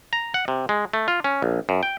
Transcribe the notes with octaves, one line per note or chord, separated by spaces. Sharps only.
A#5
F#5
C3
G#3
A3
F4
C#4
A#1
F#2
G5